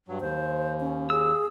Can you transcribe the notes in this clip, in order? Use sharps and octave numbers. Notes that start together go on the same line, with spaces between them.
G2 F#3
D#2 C5
C#4
G#4 E6